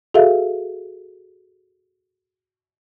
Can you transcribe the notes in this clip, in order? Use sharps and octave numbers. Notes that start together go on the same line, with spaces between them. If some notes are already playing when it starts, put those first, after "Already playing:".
F#4 G#4 A4 E5 F5